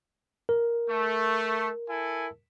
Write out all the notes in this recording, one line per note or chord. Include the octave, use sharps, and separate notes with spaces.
A#4
A3
E4 A4 G#5